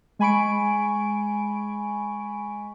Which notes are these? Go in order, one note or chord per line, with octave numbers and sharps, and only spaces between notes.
G#3 G#5 B5 C#6 D7